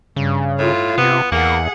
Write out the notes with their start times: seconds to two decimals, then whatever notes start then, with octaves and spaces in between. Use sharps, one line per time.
0.16 G2 C#3
0.59 A2 F4
0.98 C3 B3
1.32 E2 A#3 G#4 F#5